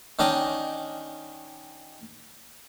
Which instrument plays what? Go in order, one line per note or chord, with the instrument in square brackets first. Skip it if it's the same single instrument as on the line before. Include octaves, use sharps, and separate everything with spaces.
[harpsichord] D#3 C#4 D4 D#5 G5